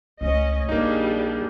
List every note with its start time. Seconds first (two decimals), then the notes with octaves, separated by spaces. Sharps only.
0.21 C#2 A3 C#4 D#5
0.69 A#1 F2 G3 A#3 D4 D#4 G#4